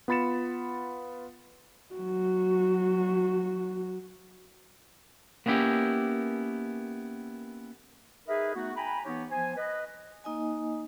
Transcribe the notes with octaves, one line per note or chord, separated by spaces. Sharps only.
B3 F4 B5 A6 C#7 E7
F#3 F#4
A#3 B3 C#4 E4 G4
D#4 G#4 A#4 B4 D#5 E5
A3 B3 D#4 F#4
G5 G#5 A#5 B5
E3 B3 D#4 G4 C#5
F3 B3 C5 G#5
B4 D#5
A#3 D#4 D#5 G#5